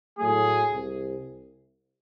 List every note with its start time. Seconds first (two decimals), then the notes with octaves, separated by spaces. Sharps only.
0.18 A2 F#3 A3 G#4
0.72 C2